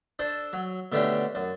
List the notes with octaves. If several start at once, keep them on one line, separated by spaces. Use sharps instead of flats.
D4 A4 C5
F#3
B2 D3 A3 C#4 D4 G4
F#2